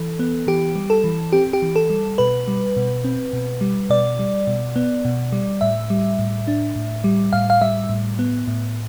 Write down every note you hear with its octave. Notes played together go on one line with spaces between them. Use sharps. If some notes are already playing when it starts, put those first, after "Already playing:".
Already playing: E3 A4
B3
E3 G4
G3
A4
E3
C4 G4
G4
E3
A4
G3
B2 B4
G3
B2
C4
B2
G3
B2 D5
G3
B2
B3
B2
G3
A2 E5
G3
A2
D4
A2
G3
A2 F5
F5
G3 E5
A2
B3
A2